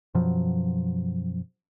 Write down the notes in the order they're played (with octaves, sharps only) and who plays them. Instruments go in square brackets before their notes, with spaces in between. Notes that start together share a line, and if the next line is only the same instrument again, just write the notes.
[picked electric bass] F#2 B2 F3 F#3